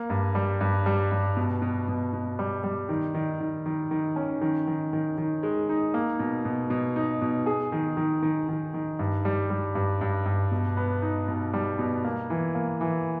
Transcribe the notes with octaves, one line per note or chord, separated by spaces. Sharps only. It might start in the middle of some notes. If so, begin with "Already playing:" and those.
Already playing: A#3
G2
G3
G2
G3
G2
B2
B2
B2
B2
G3
G3
D#3
D#3
D#3
D#3
D#3
C#4
D#3
D#3
D#3
D#3
G#3
D#4
A#3
B2
B2
B2
D#4
B2
G#4
D#3
D#3
D#3
D#3
D#3
G2
G3
G3
G2
G2
G2
B2
B3
D#4
B2
G3
B2
A#3
E3
A#3
E3